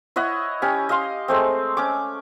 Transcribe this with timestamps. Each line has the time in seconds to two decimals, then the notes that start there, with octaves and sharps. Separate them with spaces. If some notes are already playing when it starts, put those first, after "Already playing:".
0.16 E4 C#5 D#5 F#5
0.62 C#4 G4
0.89 D#5 F5 C6
1.28 G#3 A3 C4
1.77 C#4 D6